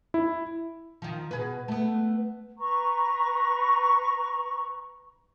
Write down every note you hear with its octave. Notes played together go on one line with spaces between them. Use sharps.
E4
D#3 F3
B2 G#4 B4
A3 B3
B4 A#5 C#6